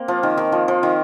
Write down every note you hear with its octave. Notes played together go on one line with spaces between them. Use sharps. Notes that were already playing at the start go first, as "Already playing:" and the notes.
Already playing: A#3 C4
F3
D#3
D#3
F3
F3
D#3